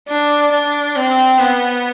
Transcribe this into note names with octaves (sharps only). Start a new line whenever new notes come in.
D4
D4
C4
B3